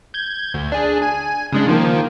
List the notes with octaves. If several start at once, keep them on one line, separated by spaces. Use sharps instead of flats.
G6 G#6
D2
D4 G#4
G#5
C#3 G#3 D4
D#3 F3 A#3